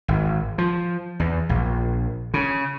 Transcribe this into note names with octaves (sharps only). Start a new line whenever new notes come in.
G#1
F3
E2
A#1
C#3